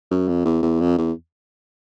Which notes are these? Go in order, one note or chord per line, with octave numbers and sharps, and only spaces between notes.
F#2
F2
E2
E2
F2
E2